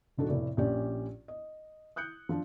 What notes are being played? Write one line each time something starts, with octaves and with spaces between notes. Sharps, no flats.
E1 G#2 D4 F#4 A4
F1 A2 D5
A#1 C#4 G4 D5
D#5
D#6 F#6 G6 C#7
F3 D4